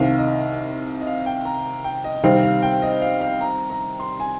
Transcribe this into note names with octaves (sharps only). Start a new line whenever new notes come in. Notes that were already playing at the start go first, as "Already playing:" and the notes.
Already playing: C2 C3 D#3 F5
D#5
D#5
F5
G5
A#5
G5
D#5
C3 D#3 G3 C4 F5
F5
G5
D#5
F5
F5
A#5
A#5
C6
G#5